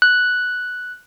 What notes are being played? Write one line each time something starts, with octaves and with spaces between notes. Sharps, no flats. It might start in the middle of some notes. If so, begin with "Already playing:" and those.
F#6